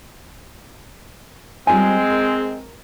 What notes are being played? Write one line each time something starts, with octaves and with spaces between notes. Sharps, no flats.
G3 G#3 C4 F4 A#4 G#5
A#4